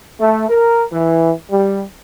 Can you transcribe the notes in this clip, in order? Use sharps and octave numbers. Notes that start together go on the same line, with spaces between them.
A3
A#4
E3
G3